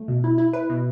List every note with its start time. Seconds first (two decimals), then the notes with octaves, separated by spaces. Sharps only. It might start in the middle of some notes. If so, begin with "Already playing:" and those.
Already playing: A3
0.08 B2
0.24 E4
0.38 E4
0.53 B4
0.70 B2